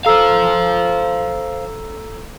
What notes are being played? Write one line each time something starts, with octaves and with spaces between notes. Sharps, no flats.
A4 C5 F5 A#5 E6